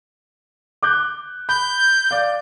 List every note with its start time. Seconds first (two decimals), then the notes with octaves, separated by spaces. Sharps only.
0.83 D6 F#6 G6
1.49 B5 G6
2.11 D5 F5